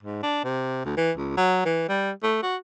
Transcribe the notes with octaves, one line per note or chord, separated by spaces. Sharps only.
G#2
D4
C3
D2
E3
C#2
F#3
E3
G3
A3
F#4